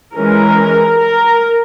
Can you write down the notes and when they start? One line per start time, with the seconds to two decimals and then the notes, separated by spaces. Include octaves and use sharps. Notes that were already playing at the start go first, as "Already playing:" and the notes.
0.15 E3 G#3 C#4 A#4
0.99 A#4